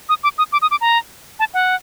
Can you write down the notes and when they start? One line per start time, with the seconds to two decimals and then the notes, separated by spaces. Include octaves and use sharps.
0.09 D#6
0.23 D6
0.38 D#6
0.52 D6
0.62 D#6
0.71 D6
0.81 A#5
1.39 A5
1.54 F#5